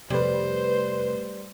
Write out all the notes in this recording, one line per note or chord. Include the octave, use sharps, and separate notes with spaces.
F2 C3 G3 A3 B4 C5